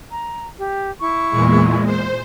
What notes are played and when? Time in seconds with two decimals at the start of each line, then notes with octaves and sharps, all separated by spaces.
0.10 A#5
0.57 G4
1.00 E4 C#6
1.30 E2 A#2 G#3
1.85 C5